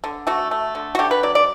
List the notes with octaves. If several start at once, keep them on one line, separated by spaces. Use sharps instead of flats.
D3
A3 F#4
A3
D3
F#4
D3 G4
B4
F#3 D5
D5